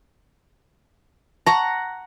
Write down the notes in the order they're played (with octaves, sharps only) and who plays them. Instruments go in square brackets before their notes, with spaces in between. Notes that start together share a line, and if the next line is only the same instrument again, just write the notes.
[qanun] F#5 A#5 [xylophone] A5 C#6